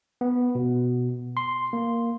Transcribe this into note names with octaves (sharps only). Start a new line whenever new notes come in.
B3
B2
C6
A#3